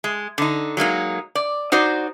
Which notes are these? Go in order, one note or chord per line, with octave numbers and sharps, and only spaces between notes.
G#3
D3 D#4
F#3 G#3 A#3 D#4
D5
D#4 F#4 C5 D5